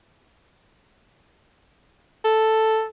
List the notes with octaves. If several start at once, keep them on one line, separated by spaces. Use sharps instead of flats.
A4